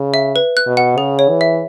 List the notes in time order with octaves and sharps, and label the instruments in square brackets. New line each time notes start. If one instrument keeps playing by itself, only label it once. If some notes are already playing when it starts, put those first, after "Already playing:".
Already playing: [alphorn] C#3
[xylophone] E5
B4
F#6
[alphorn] B2
[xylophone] F#5
[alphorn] C#3 [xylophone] G#4
[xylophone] C#5
[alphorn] E3
[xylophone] E5